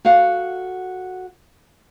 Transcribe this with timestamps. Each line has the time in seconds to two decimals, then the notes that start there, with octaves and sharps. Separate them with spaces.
0.05 F#4 A4 F5 F#5